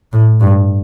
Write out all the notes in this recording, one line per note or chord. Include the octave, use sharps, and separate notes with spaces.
A2
G2